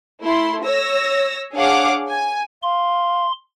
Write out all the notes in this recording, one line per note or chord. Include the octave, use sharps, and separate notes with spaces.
A3 E4 C6
C#5 E6 A#6
D4 G#4 C#5 F5 F#5 D6
G#5
F5 C6